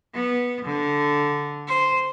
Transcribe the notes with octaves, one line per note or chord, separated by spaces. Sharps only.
B3
D3
C5